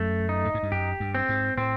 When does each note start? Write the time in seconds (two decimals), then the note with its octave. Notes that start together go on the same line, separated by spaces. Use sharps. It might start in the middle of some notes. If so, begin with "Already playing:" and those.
Already playing: F#2 A3
0.29 D#4
0.45 A2
0.54 G#2
0.63 G2
0.72 F#2 G4
1.00 G2
1.15 C4
1.29 G#2
1.58 A2 C4